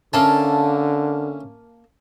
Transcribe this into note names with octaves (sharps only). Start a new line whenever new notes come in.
D3 A#3 C#4 E4 A5